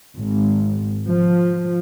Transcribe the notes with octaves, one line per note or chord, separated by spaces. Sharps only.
G#1
F3